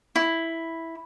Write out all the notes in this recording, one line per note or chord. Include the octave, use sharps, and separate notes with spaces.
E4